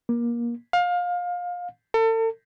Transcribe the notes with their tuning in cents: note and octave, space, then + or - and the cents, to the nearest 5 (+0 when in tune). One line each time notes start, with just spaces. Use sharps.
A#3 +25
F5 +25
A4 +40